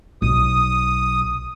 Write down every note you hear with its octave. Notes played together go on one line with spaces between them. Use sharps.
B1 D#6